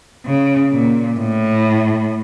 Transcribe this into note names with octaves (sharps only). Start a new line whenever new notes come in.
C#3
A#2
A2